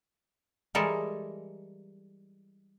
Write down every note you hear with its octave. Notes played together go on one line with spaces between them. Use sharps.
E3 G3 G#3 E4 A4 A#4